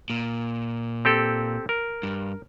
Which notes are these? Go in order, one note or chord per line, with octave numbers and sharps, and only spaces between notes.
A#2
C4 G4 A4
A#4
G2